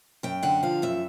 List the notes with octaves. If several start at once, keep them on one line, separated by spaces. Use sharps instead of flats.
F#2 G5
D3 F#5
F3 F5
F#2 E5